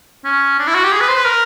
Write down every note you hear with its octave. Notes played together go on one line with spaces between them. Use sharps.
C#4
D4
E4
F#4
G4
G#4
B4
C5
B4
A#4